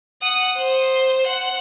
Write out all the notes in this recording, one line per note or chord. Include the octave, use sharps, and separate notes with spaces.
F#5 D#6
C5
F#5